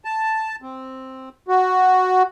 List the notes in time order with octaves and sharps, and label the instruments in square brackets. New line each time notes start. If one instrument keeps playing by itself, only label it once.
[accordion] A5
C4
F#4